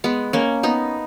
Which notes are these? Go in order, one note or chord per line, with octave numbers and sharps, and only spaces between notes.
G#3 B3
A#3 C#4
B3 D#4